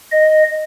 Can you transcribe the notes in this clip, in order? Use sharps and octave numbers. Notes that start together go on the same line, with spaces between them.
D#5